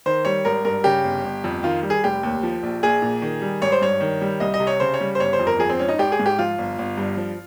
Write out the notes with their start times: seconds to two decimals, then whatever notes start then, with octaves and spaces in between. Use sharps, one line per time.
0.06 D#3 C5
0.25 G3 C#5
0.45 G#1 A#4
0.65 G2 A#4
0.84 C#3 G4
1.04 G1
1.24 G1
1.44 F2
1.63 D#3 F4
1.83 G3
1.90 G#4
2.04 F1 G4
2.23 D#2
2.43 F3
2.63 A#1
2.83 A#1 G#4
3.02 A#2
3.22 D#3
3.42 G3
3.62 G#1 C#5
3.72 C5
3.81 G2 C#5
4.01 D#3
4.22 G3
4.40 C2 D#5
4.54 D#5
4.60 C3
4.67 C#5
4.80 C#3 C5
4.94 C#5
5.01 G3
5.15 C5
5.20 G1 C#5
5.33 C5
5.39 F2
5.47 A#4
5.59 F3 G#4
5.69 C4
5.79 G#1 C#4
5.88 D#4
5.98 G#1 G4
6.12 G#4
6.19 G#2
6.26 G4
6.39 F3 F4
6.58 G1
6.79 G1
6.97 G2
7.17 F3